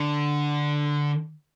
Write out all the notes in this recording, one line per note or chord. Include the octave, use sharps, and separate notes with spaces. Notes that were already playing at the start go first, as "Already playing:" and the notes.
Already playing: D3